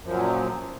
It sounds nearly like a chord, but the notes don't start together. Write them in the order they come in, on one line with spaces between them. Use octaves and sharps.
F#2 F3 F#3 A#2